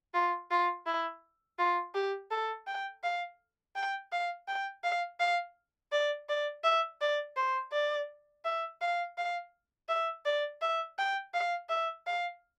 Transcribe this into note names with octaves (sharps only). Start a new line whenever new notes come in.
F4
F4
E4
F4
G4
A4
G5
F5
G5
F5
G5
F5
F5
D5
D5
E5
D5
C5
D5
E5
F5
F5
E5
D5
E5
G5
F5
E5
F5